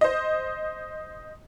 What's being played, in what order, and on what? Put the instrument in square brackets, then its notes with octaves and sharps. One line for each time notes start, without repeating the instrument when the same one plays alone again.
[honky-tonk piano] C5 D#5